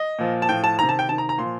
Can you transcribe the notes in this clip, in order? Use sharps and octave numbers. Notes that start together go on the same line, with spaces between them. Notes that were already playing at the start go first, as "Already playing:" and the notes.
Already playing: D#5
A#2 F3
A5
A2 F3 G5
A5
C3 D#3 A#5
A5
G5
C3 D#3 A5
A#5
A#5
A#2 F3 C6